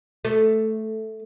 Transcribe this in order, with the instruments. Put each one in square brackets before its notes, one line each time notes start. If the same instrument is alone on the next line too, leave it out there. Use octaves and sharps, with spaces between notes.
[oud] A3